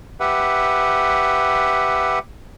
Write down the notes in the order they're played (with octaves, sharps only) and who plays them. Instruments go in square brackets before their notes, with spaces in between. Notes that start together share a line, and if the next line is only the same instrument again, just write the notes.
[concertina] G4 B4 E5 F#5